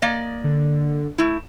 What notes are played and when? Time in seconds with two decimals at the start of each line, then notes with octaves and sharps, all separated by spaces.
0.02 A#3 D5 D#5
0.44 D3
1.18 A3 E4